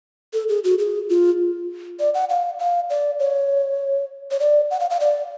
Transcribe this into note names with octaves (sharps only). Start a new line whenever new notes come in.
A4
G#4
F#4
G#4
F4
D5
F#5
F5
F5
D5
C#5
C#5
D5
F#5
F5
F5
D5